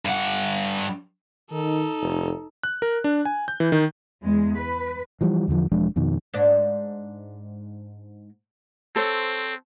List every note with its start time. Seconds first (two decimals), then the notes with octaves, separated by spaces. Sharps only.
0.05 G2 F#5
1.52 D#3 D#4 A4
2.01 F1
2.63 F#6
2.82 A#4
3.04 D4
3.25 G#5
3.48 G6
3.60 E3
3.72 D#3
4.22 E2 G#3
4.57 B4
5.21 E3 F3 G3
5.48 E2 D3 D#3 F3
5.72 E1 F3 G#3 D4
5.96 F2 B2 D#3
6.34 G#2 D4
8.96 C4 A4 C5 C#5